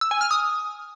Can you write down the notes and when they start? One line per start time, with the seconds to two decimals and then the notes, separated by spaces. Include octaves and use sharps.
0.01 E6
0.11 G#5
0.21 F6
0.31 D#6